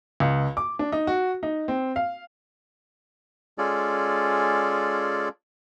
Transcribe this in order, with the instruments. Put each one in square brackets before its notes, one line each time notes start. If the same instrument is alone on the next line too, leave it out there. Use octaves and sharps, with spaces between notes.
[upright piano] C#2
D6
D4
D#4
F#4
D#4
C4
F5
[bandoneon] G#3 C#4 F4 G#4 A4 D5